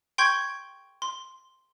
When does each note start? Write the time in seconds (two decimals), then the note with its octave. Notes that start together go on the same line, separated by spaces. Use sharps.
0.18 G5 C6 C#6 G6 G#6
1.02 C6